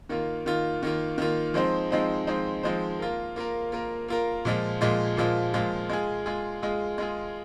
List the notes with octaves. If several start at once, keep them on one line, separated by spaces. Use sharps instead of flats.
D#3 A#3 F4
D#3 A#3 F4
D#3 A#3 F4
D#3 A#3 F4
F3 G#3 C4 D#4 C5
F3 G#3 C4 D#4 C5
F3 G#3 C4 D#4 C5
F3 G#3 C4 D#4 C5
A#3 F4 A#4
A#3 F4 A#4
A#3 F4 A#4
A#3 F4 A#4
A#2 F3 G#3 F4
A#2 F3 G#3 F4
A#2 F3 G#3 F4
A#2 F3 G#3 F4
G#3 F4 G#4
G#3 F4 G#4
G#3 F4 G#4
G#3 F4 G#4